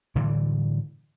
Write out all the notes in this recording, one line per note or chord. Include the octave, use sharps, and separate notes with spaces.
A2 D3 E3 G3